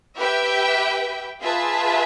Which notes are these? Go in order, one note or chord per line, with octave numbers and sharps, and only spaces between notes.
G4 B4 E5 G5
F4 G#4 B4 E5 A5